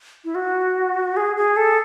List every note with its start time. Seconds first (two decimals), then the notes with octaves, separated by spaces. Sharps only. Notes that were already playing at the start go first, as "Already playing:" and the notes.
0.25 E4
0.35 F#4
1.17 G#4
1.36 G#4
1.57 A4